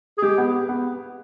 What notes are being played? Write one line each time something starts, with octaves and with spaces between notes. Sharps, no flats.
G#4
G#3 G4
B3
B3